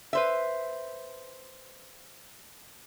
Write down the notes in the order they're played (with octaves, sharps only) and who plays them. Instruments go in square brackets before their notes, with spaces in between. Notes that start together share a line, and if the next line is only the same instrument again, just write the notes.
[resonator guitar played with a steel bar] B4 C5 E5